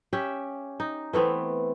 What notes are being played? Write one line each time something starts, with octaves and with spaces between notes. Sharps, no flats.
C#4 G4 E5
D#4
E3 A3 B3 C4